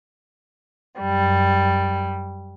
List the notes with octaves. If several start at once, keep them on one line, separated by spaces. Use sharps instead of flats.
F#2 G3